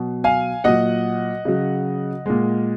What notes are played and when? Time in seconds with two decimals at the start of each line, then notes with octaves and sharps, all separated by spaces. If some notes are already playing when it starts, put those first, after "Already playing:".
Already playing: B2 F#3
0.24 F5 G#5
0.64 A#2 F#3 D#5 F#5
1.45 C#3 F#3
2.26 A#2 G#3